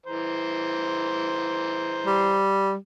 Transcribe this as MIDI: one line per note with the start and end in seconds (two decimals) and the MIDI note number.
0.06 2.43 52
0.06 2.43 72
0.06 2.43 82
2.06 2.75 55